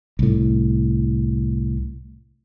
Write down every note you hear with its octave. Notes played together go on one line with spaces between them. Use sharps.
C2 A2